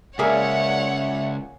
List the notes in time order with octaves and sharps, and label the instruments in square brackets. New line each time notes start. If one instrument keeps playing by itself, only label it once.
[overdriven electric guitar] C#2 [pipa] A#3 G#4 [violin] C#5 F#5 [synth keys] D5 E5